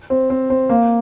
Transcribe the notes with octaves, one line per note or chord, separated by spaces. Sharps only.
C4
C4
C4
A#3